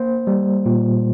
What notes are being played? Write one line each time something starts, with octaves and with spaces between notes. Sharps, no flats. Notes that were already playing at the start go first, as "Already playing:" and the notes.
Already playing: A#3 C5
G3
A#2